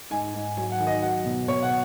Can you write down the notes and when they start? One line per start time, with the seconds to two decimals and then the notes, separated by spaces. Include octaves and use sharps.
0.10 G#2 G#5
0.34 G#2
0.57 F#3 G#5
0.72 F#5
0.80 D#3
0.87 D#5
1.02 F#3 F#5
1.24 B2
1.48 B2 C#5
1.62 F#5